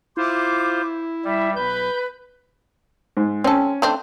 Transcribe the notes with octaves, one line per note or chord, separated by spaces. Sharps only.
E4 F4 C5 D6
G3 E5
B1 B4 G6
G#2
C4 C#4 A4
A3 C4 D4